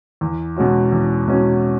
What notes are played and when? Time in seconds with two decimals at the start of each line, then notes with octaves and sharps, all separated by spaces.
0.21 E2
0.57 B2 G#3 C#4 F#4
0.92 E2
1.28 B2 G#3 C#4 F#4